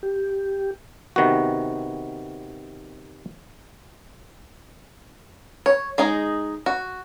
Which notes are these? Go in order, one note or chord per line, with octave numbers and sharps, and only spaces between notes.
G4
C3 D#3 B3 F#4
C#5
G#3 D#4 G#4
F#4